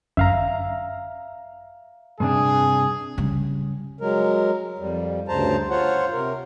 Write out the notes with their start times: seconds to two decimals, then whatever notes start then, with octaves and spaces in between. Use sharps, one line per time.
0.17 G1 F#2 E5 F5 A#5
2.20 G2 C3 D4 G#4
3.18 C#3 G3
4.01 F#3 G#3 A#4
4.79 F2 G3
5.28 D2 G2 C#3 C5 A5 A#5
5.70 F4 C5 C#5 F#5
6.12 C3 A#4